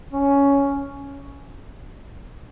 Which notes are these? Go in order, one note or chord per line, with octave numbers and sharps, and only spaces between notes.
C#4